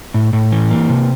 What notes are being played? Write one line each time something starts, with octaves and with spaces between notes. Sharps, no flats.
A2
A2
E3
A#3
C3